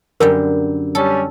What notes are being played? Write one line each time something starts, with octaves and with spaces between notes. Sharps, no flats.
F#2 D3 G3 A#4
G3 C#4 A4